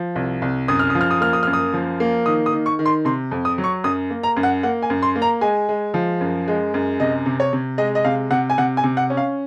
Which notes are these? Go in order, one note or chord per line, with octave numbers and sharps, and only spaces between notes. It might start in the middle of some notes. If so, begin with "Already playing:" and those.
Already playing: F3
C2
C2
F#2 D#6
F6
F3 D#6
F6
D#6
A#3 F6
D#6
F#2 F6
D#6
F3
A#3
D#3 D#6
D#6
D#3
C#6
D#3
C6
C3 C6
F2
D#6
F#3
C#6
F#2 D#6
A#3
A#5
F#2
F#5
A#3 F#5
G#5
F#2
C6
A#3
A#5
G#3 G#5
G#3
F3
F#2
G#3
F#2
C3 D#5
C3
C#5
C3
G#3 D#5
D#5
C3 F5
C3 F#5
G#5
C3 F#5
G#5
C3
F#5
C#4
F5